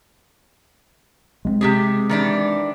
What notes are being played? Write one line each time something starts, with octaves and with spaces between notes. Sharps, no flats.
G#3 A3 C4
C3 G4 G#4
D#3 E3 D4